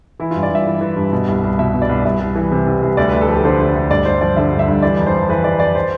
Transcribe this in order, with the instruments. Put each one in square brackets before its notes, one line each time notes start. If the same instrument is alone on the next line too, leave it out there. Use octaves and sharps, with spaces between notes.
[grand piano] E3 E4
G2 F4
D5
G2 E5
E3
E3
G2
B2
C2
C2
B2 E5
B2
D5
C2
C2 E5
C2
E3
C3
C2
C2
D2 D5
D2 B4
A4
F3 G4
D3 C5
D2
D2
G2 D5
G2 C5
F3 D5
D3 E5
G2
E5
G2
E3 D5
F2
C5
F2
E3 B4
E3 D5
F2 D5
C5